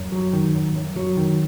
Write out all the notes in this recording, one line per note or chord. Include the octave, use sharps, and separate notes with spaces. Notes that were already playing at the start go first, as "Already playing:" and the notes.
Already playing: F#2
F#3
D#3
F#2
F#2
F#3
D#3